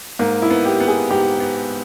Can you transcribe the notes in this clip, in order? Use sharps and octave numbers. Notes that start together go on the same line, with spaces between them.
G#2 A#3
E4
B3
G4
B3
G#4
G#2 G4
B3